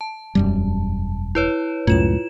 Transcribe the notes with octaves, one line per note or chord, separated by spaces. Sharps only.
A5
E1 F#2 G3
E4 B4 C#5
C#2 F#2 A2 F4 E7